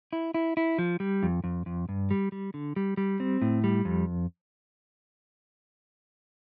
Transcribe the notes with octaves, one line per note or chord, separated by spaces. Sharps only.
E4
E4
E4
F3
G3
F2
F2
F2
G2
G3
G3
D3
G3
G3
C4
A2
G3
F2